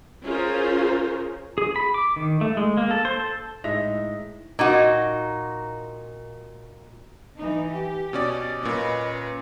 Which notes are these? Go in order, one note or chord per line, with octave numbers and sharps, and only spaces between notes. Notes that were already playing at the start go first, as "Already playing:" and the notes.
C#4 F4 G#4 A#4 C5
G#4
B5
D6
D#3
A3
G#3
A#3
A4
C5
A4
A2 G#3 D#4 E5 A#6 F7
A#2 D#4 F#4
E3 D#4
G4
B2 C#4 D5
A#2 C#4 B4 D#5